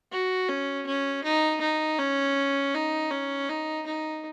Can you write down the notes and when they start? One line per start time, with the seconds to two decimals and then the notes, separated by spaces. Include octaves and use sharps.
0.12 F#4
0.49 C#4
0.86 C#4
1.23 D#4
1.61 D#4
1.98 C#4
2.74 D#4
3.11 C#4
3.49 D#4
3.86 D#4